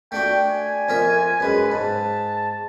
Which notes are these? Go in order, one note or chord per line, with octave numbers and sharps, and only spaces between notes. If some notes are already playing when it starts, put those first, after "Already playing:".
A3 D4 F#4 G5
G#5
F2 A#4 E5
F#2 G#3 B4
G#2 A5